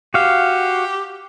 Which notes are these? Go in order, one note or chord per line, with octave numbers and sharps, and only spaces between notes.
F#4 G4 F5